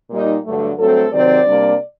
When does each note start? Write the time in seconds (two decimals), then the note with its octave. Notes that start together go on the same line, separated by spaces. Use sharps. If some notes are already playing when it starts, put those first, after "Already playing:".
0.10 A#2 G3 A#3 D#4
0.45 G2 D3 F#3 A3
0.78 G2 F#3 A3 C4 A4
1.12 C3 D#3 F#3 C4 D5
1.46 C3 G3 A#3 D4